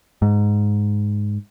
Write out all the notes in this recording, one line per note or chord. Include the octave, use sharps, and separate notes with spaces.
G#2